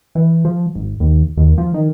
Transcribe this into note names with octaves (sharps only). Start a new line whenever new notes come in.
E3
F3
G#1
D#2
D#2
F3
D#3